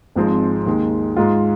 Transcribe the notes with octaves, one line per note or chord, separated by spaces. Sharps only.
G#1 G#2 F3 G#3 C4
D#2 D#3 G#3
G#2 G#3 F4